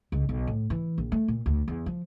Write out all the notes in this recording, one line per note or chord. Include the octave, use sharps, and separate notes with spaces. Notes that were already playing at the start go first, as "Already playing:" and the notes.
C#2
B1
A2
E3
A#1
A3
A#2
D2
E2
F3